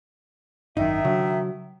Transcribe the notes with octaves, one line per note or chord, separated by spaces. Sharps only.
G#1 F#2 D#3 D#4 E5
C#3 F#3 D4